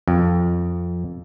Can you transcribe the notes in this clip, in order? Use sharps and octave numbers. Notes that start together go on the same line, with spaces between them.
F2